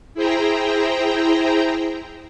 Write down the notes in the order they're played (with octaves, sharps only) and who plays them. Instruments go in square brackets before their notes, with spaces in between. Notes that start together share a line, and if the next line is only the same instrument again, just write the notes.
[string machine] E4 G#4 C5 G5 A#5